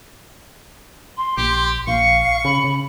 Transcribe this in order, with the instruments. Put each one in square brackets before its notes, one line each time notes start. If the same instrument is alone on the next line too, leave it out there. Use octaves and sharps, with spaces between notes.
[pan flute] C6
[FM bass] A#1 [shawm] G4
[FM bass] A#1 [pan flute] F5 [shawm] C#6
[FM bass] C#3 [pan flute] B5
[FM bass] C#3